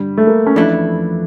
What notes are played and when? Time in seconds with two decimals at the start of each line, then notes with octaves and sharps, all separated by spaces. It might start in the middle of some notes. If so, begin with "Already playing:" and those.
Already playing: G2 D3 G3
0.18 A3
0.27 A#3
0.46 C#4
0.56 F2 E3 A3 D4 E4